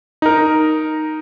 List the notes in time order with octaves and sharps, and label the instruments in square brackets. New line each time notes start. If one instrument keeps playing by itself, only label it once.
[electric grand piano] D#4 A#4